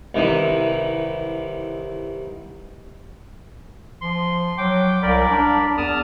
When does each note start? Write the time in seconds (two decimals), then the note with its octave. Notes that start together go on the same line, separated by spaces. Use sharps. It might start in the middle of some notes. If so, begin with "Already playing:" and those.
0.15 C2 D#3 E3
4.02 F3 C6
4.58 F#3 G5 D6
5.02 C2 A#4 D5 B5
5.30 D4
5.78 E2 A5 D#6 F6